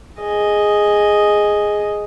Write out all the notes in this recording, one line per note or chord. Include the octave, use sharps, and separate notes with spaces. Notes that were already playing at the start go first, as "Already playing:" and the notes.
G#4 D#5